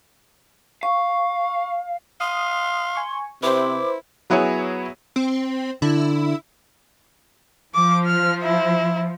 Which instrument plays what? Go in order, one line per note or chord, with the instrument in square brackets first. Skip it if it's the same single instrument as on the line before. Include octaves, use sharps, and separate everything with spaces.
[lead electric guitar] F5 [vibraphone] C#6
[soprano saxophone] F5 [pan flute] C6 [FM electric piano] D#6
[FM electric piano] G#5 C#6
[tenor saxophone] C3 [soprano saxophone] E4 [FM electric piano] B4 C5 [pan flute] D6
[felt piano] F#3 B3 E4 G#4 C#5
[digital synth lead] C4
[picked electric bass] D3 [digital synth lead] E4
[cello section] F3 [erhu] D6
[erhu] F6
E4